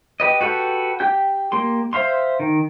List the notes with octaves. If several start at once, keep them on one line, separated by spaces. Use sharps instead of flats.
G4 B4 D#5
F#4 G4 A4 B4
G4 G5 G6
A#3 G4 C6
C5 E5 F5 C6
D#3